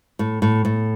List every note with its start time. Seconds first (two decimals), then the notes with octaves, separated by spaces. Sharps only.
0.19 A2
0.42 A2
0.65 A2